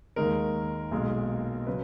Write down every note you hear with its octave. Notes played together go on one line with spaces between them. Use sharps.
D#2 D#3 G#3 A#4
B1 A#2 G#3
C#3 F#3 B4